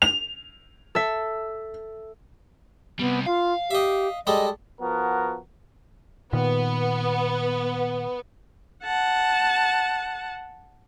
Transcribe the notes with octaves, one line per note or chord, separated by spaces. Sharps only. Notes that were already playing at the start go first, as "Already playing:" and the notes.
F7
A4 E5
C3 G3 B3
F4 F5
G4 D#5 E5
G3 G#3 A4 D#5
F3 B3 F#4 A#4
A#2 D#3 B3
F#5 A5